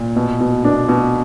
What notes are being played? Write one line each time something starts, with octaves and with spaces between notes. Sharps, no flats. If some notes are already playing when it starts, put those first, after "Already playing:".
Already playing: A#2
B2
B2
B2 D4
B2